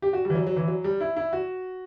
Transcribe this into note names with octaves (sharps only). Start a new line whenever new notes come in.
G4
F#4
G3
E3
F#3
F#3
E3
F#3
G3
E4
E4
F#4